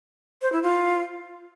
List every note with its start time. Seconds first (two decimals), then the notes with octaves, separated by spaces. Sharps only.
0.42 C5
0.52 E4
0.63 F4